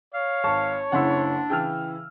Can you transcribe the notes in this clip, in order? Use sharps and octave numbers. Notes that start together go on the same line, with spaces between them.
C#5 F5
G#1 A5 C#6
F#1 C#3 D4 E4 F#5 C6 E6
C#3 E3 G5 E6 F6